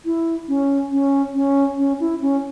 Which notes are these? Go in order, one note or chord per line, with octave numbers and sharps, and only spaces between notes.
E4
C#4
C#4
C#4
C#4
E4
C#4